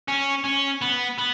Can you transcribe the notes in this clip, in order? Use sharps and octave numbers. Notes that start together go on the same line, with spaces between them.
C#4
C#4
B3
B3